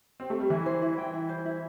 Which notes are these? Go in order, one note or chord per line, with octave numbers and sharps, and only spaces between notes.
C4
A3
G3
E3 E4
C5
E4
G5
E4
C5
E4